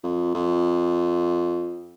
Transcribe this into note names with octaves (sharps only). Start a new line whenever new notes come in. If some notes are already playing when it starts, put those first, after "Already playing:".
F2
F2